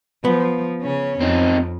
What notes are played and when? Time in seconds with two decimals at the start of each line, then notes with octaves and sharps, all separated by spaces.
0.25 F3 B3
0.82 C#3 C#4
1.21 F2 C4 D#4